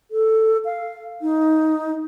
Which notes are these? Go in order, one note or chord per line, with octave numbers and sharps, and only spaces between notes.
A4
F5
D#4